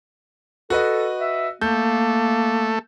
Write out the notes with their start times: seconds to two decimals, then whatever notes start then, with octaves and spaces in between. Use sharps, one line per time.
0.70 F#4 A4 B4 D#5
1.20 E5
1.61 A3 A#3 G6